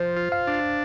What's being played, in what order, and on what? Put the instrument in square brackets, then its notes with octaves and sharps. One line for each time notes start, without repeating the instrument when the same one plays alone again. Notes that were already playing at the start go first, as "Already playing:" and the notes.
Already playing: [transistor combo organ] F3 [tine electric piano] C5
[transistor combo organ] F4
[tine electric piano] F5
[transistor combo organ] D4